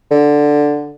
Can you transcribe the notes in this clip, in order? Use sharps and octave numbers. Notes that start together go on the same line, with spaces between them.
D3